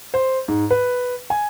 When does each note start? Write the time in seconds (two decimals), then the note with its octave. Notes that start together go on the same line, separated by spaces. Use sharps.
0.14 C5
0.48 G#2
0.71 B4
1.30 G#5